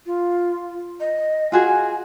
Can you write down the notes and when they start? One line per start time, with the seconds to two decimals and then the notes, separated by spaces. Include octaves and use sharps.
0.06 F4
1.00 D#5
1.52 F4 F#4 G#4 G#5